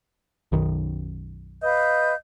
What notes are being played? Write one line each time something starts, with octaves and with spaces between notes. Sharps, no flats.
B1 F#2 D#3
B4 D#5 F5 G6